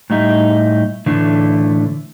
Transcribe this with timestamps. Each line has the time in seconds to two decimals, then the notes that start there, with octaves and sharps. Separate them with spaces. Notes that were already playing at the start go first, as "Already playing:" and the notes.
0.10 A2 G3 D#4 E5
1.06 A2 D3 E3 A3